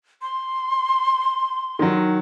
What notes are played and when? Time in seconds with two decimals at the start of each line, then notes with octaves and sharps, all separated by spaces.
0.22 C6
1.79 D#3 F#3